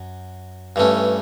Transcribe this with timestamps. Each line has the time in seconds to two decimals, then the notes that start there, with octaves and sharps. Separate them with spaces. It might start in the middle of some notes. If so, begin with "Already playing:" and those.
Already playing: F#2
0.76 G2 E3 A3 C#4